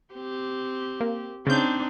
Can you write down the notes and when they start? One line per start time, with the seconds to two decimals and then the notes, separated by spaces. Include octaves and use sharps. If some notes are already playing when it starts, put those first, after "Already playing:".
0.14 C4 G4
1.00 A#3
1.47 C#3 C4 D4 D#4 G6